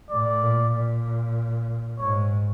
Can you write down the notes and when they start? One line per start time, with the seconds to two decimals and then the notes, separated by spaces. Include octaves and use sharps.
0.10 A2 D5
0.41 A#2
0.73 A#2
1.99 G#2 C#5